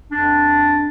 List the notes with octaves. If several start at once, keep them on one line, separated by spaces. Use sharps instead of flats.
F2 D4